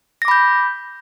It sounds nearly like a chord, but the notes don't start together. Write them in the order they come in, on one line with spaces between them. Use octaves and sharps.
A#6 D6 B5 G6